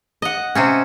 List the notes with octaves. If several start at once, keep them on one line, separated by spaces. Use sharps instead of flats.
D#5 F#5
C3 C4 C#4